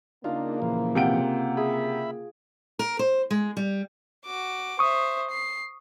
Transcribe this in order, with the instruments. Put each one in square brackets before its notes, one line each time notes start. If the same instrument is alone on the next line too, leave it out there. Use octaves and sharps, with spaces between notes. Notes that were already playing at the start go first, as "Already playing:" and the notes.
[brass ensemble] C#3 A#3 [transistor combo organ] D4 D#4 [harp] F4
[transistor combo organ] A#2 E3 F3
[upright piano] C3 F#5 D7 [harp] F4 G5
[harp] G#4 [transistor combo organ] E5 B5
[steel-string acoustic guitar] A#4
C5
G#3
G3
[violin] F#4 D6
[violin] C5 E5 [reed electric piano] C#6 D#6
[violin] C7